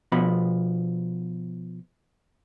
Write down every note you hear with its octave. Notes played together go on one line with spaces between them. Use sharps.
B2 F3 B3 B5